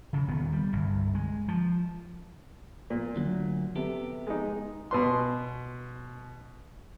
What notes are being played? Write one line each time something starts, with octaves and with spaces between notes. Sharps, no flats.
C#3
D#1 D#3 B3
G3
G1 C2
G#3
F3
A#2
D2 F#3
C3 B3 G4 A4
G#3 D#4
B2 B4 C6